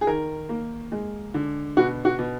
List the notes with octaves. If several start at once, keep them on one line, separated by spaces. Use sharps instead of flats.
G#4
D#3 A#4
A#3
G#3
D3
B2 F#4
F#4
B2